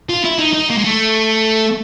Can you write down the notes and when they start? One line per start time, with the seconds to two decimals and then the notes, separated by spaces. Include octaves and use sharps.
0.09 F4
0.24 E4
0.39 D#4
0.54 D#4
0.70 A#3
0.78 G#3
0.84 A3